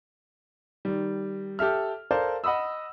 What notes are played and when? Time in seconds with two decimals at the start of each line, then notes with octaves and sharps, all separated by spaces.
0.85 D#3 G3
1.59 G4 A4 E5 F6
2.11 A4 A#4 C5 D5 F5
2.44 D#5 F#5 B5 D#6 E6